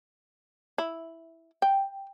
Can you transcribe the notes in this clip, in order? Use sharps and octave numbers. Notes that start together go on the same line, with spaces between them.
E4
G5